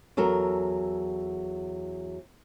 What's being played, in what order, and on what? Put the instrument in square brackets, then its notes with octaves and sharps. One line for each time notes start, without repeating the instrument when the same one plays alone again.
[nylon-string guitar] E2 F#3 A4 A#4